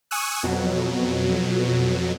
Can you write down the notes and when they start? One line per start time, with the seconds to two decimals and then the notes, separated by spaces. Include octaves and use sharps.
0.11 G#5 C#6 D#6 E6 F#6
0.43 F2 B2 F#3